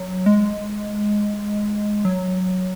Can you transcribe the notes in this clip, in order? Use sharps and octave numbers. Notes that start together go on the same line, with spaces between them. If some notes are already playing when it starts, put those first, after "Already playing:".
Already playing: F#3
G#3
F#3